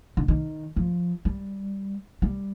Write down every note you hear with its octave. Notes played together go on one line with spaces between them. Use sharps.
D3
D#3
F3
G3
G3